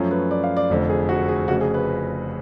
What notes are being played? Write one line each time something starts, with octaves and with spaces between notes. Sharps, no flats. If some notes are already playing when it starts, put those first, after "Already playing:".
Already playing: F#2 F3 A3 C#4
B4
D5
F5
D5
F1 F2 D3
G#4
F#4
G#4
F1 F2 C#3 F#4
G#4
B4